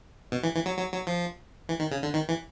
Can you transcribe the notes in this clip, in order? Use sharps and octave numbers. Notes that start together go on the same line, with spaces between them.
B2
E3
E3
F#3
F#3
F#3
F3
E3
D#3
C#3
D3
D#3
E3